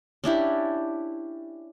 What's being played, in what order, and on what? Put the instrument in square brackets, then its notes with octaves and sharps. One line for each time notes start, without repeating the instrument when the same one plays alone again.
[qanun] C#4 D4 E4 G4